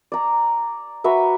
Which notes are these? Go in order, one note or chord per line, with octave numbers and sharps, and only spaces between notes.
D5 A#5
F#4 B4 E5 A#5